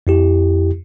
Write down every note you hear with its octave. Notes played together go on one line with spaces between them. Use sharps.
F2 E4 G4